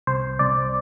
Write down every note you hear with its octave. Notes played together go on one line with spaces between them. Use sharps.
C2 C5
C2 D5